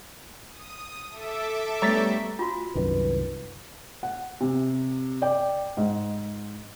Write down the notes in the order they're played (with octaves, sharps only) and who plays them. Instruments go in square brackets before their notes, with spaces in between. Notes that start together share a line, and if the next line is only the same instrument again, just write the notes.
[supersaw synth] D#6
A4 E5 D6
[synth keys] G3 C#5 [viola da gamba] A3 B3 D4 [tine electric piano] A#5 A6 B6
[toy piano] F4 F#4
[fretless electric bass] C2 F#2 D#3 [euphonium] B4
[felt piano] F#5
C3
D5 G5
G#2